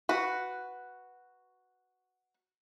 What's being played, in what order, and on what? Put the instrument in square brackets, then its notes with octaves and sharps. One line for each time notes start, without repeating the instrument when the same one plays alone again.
[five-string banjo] F#4 B4